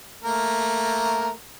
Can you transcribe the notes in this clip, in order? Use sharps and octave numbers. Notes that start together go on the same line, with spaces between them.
A3 A#3 A#4